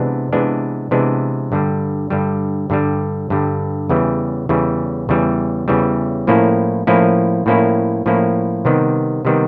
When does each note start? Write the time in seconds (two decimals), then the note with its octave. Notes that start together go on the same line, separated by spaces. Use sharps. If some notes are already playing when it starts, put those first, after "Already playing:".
Already playing: C3 E3 G#3 B3 D4
0.33 C3 E3 G#3 B3 D4
0.91 C3 E3 G#3 B3 D4
1.52 G2 D3 G3
2.10 G2 D3 G3
2.70 G2 D3 G3
3.30 G2 D3 G3
3.89 E2 C#3 E3 G3
4.49 E2 C#3 E3 G3
5.09 E2 C#3 E3 G3
5.68 E2 C#3 E3 G3
6.27 A2 F3 A#3 C#4 E4
6.87 A2 F3 A#3 C#4 E4
7.46 A2 F3 A#3 C#4 E4
8.06 A2 F3 A#3 C#4 E4
8.65 C3 D#3 G3 B3
9.25 C3 D#3 G3 B3